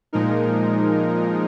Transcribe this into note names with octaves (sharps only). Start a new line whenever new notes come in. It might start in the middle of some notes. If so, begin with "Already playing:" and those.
A#2 F3 G#3 D#4 A#4